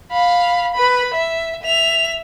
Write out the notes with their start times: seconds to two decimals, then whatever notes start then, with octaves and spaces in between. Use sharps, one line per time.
0.12 F5 B5
0.74 B4 B5
1.14 E5
1.63 E5 F7